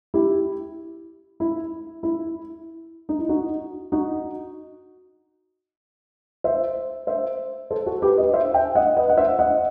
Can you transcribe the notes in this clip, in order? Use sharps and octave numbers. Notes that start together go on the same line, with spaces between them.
E4 G4
E4
E4
D#4
E4
D#4 F#4
D#4 F#4
C5 E5
C5 E5
A4 C5
F#4 A4
G4 B4
B4 D#5
C5 E5
E5 G5
D#5 F#5
B4 D#5
F#5
C5 E5
D#5 F#5